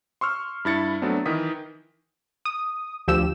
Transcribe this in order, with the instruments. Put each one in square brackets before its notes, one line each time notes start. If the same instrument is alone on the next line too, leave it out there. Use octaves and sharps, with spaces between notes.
[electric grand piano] C6 C#6 E6 F6
G2 E4 A6 C#7
F#3 A3 B3 C4 D4
D#3 E3 D#6 B6
[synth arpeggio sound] D#6
D2 F3 G4 E6 E7